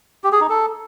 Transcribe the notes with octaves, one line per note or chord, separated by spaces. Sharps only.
G4
G#4
D#4
A4